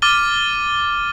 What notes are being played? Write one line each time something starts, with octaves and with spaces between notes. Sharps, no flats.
D6 F6 A6 D#7 G7